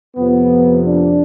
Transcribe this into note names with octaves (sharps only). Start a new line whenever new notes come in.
F2 C3 F3 B3
D4